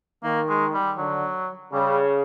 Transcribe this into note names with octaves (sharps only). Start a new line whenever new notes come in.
D#3 A#3
G#3
G3
D3 F#3
C#3 G3